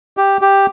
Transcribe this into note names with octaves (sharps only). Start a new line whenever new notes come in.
G4
G4